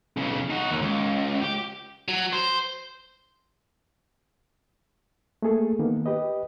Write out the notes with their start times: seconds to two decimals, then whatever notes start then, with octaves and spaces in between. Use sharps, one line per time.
0.17 B1 C#3
0.50 D#4 F#4
0.70 D#2
0.82 C#2
1.41 G4
2.08 F#3
2.33 C5
5.42 A3 A#3 G#4 A4
5.79 D#3 A#3 B3
6.06 G4 B4 D#5